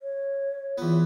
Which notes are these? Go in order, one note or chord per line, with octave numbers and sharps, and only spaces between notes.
C#5
E2 B3 F4